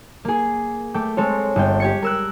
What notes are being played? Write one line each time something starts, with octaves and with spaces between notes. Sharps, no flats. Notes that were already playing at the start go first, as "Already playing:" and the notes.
A#3 G#4
A3 G5 D6
G#3 C4 A4 C#5
G1 G5
G4 G#6 C#7
A#4 E6 F#6